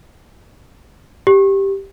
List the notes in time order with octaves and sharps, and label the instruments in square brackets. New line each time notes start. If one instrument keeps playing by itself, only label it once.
[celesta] G4